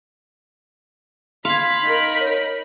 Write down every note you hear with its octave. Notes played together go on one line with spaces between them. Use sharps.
F5 B5 C6 G#6
D#4 A#4
C#5